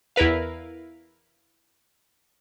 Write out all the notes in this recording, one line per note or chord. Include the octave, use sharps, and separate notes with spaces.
E2 E4 A#4 B4 F5